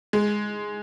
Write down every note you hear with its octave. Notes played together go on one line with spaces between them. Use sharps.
G#3